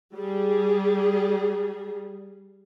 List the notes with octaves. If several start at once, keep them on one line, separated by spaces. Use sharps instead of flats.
G3 G#4